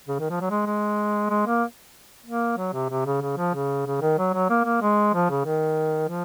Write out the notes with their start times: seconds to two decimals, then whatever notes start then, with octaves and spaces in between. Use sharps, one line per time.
0.08 C#3
0.19 D#3
0.30 F3
0.41 F#3
0.50 G#3
0.66 G#3
1.30 G#3
1.47 A#3
2.26 A#3
2.58 F#3
2.74 C3
2.89 C3
3.06 C#3
3.21 C#3
3.37 F3
3.54 C#3
3.86 C#3
4.01 D#3
4.18 F#3
4.34 F#3
4.50 A#3
4.65 A#3
4.82 G#3
5.14 F3
5.30 C#3
5.45 D#3
6.09 F3